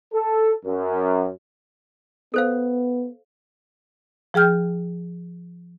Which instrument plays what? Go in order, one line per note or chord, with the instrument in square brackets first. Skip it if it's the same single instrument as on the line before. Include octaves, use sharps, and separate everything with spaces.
[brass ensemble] A4
F#2
[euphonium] B3 [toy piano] A4 C5 F5
[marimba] F3 G#4 G5 F6 G6